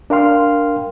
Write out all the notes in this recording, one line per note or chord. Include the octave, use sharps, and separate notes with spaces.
D4 A#4 F5 G5 C6 F6